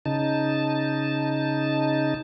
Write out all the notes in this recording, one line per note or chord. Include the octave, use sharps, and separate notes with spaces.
C#3 D#4 A5